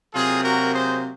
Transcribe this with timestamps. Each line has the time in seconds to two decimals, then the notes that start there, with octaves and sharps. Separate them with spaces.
0.13 C3 F#3 A#3 F4 G#4
0.43 F#4 A#4
0.73 G#4 C5